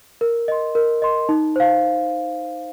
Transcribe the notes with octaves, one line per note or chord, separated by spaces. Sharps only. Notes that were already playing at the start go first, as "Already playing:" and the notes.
A#4
D#5 C6
A#4
D#5 C6
D#4
C5 F5